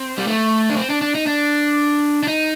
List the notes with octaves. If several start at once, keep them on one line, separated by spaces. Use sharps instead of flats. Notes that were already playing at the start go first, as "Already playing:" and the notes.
Already playing: C4
G3
A3
D4
C4
D4
D4
D#4
D4
D4
D#4